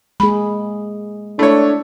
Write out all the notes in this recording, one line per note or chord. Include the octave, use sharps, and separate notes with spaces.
G#3 A#3 G#4 B5
A3 D4 E4 C#5